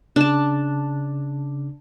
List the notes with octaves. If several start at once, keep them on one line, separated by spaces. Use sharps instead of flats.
C#3 D4 A5